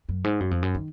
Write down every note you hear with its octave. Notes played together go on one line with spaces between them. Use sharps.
F#2
G#2
F#2
F2
F#2
D#3